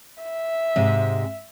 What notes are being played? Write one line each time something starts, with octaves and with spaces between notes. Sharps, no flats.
E5
G#2 C3 G#3